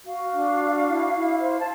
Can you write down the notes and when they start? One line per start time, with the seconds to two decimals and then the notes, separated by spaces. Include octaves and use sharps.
0.06 F#4 F5
0.33 D4
0.60 F#4
0.87 E4
1.13 E4
1.41 C5
1.59 A5